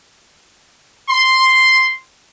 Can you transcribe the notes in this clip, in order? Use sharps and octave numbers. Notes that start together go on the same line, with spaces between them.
C6